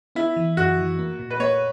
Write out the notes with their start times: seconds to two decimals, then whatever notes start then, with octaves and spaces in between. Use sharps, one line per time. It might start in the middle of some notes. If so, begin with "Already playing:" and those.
0.15 B3 E4
0.36 E3
0.57 F#2 F#4
0.79 E3
0.99 A#3
1.19 A#2
1.30 B4
1.40 A#3 C#5